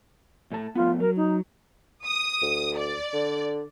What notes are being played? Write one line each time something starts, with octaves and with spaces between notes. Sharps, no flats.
A2 A3 A5
F3 A3 B3 F4
F#3 A#4
D#4
D#6
D2
D5
D3